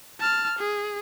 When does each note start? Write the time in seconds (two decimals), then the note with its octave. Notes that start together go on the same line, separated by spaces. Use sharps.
0.20 A5 F6
0.59 G#4